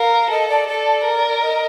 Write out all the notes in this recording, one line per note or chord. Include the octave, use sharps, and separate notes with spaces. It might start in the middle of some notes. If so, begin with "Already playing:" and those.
Already playing: A#4 F5
A4 D#5
D5
A4 D5
A#4
D#5